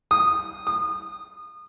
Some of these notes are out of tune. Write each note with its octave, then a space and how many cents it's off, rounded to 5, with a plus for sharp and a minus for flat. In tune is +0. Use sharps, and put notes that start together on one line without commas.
D#6 -10
D#6 -30